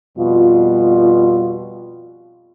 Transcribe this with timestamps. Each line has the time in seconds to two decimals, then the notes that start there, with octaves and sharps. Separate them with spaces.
0.18 F2 B2 G3 F4